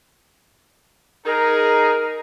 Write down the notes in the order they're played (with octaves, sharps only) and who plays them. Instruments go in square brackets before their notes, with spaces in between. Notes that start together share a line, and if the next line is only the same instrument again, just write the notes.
[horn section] D#4 G#4 [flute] A#4